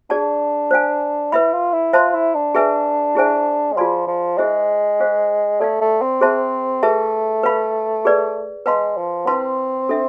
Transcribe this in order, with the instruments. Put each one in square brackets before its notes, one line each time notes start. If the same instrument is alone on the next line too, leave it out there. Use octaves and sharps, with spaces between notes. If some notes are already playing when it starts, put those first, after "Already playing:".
[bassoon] D4 [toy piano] G#4 D5 A5
[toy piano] C5 F5 G#5
[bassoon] E4 [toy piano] B4 E5 B5
[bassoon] F4
E4
[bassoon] F4 [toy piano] C5 E5 A5 C6
[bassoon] E4
D4
[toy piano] G#4 B4 E5 G#5
E4 G#4 C5 E5 G#5
[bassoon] G#3
[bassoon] F3 [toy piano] F4 G#4 D5 G#5 C6
[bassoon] F3
[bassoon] G#3 [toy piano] E4 G#4 C5 E5
[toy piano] G#4 C5 F5
[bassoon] A3 [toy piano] A4 D5 F5
[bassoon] A3
C4
[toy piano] G#4 C5 E5 A5 C6
[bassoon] A3 [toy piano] G#4 B4 E5 A5
[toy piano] B4 F5 B5
G#4 B4 D5
[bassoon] G#3 [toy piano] B4 F5 A5 C6
[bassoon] F3
[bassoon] C4 [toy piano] E4 B4 F5 A5 C6
[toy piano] D4 A4 E5